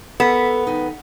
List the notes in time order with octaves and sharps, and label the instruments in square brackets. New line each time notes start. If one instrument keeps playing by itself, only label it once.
[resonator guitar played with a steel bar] B3 [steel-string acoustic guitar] A4 A#4 E5
[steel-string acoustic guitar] D#2 D#4